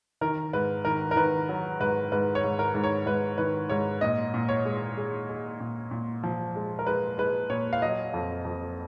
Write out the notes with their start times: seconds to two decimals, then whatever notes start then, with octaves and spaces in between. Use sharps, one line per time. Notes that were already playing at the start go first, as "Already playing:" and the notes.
0.21 D#3 A#4
0.53 G#2 B4
0.85 D#3 A#4
1.11 A#4
1.16 D#3 B4
1.49 F#3
1.80 G#2 B4
2.12 G#2 B4
2.35 C#5
2.44 G#2
2.59 A#4
2.74 G#2
2.84 C#5
3.06 G#2 B4
3.38 D#3 B4
3.69 G#2 C#5
4.01 A#2 D#5
4.34 A#2
4.49 C#5
4.65 G#3
4.97 G#3
5.29 G#3
5.60 A#2
5.91 A#2
6.23 F3
6.56 G#3
6.79 A#4
6.87 G#3 B4
7.18 G#3 B4
7.50 A#2 C#5
7.73 F5
7.82 F#3 D#5
8.13 F2
8.45 F2